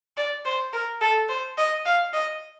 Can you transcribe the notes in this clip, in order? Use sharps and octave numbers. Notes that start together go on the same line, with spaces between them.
D5
C5
A#4
A4
C5
D#5
F5
D#5